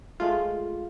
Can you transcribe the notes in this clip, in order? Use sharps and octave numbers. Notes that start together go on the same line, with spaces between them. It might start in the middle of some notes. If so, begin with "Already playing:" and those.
G#3 A3 F4